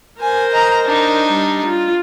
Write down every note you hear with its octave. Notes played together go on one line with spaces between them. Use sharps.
A#4 C5 G#5
D#5 A#5
D4 D#4
G3
F4